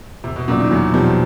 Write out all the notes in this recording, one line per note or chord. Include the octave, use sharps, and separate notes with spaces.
E2 C3
B2
A#2 C#3 F#3 B3 D4
D#3
E2 F#3
B2 F3 G3 C4